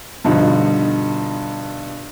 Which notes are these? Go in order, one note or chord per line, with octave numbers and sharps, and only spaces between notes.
G2 B2 D3 F3 D#4